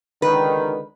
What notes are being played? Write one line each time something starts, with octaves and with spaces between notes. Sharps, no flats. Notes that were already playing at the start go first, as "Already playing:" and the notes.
C#2 D3 D#3 B4